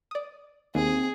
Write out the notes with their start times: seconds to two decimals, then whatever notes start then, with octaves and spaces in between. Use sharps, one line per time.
0.11 D5 D#6
0.75 D#2 C4 G#4